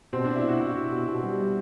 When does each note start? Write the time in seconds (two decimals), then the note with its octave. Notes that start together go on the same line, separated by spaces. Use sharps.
0.13 B2 C4
0.24 B2 D4
0.36 E4
0.44 B2 F#4
0.60 B2 E4
0.75 B2
0.91 B2
1.08 B2
1.23 G3
1.40 G3